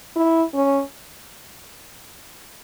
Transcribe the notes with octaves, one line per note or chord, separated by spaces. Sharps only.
E4
C#4